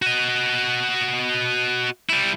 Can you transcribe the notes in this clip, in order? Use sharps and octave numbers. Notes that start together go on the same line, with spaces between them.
F#4 D#5
G3 E4